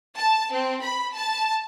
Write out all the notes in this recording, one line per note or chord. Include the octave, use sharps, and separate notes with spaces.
A5
C4
B5
A5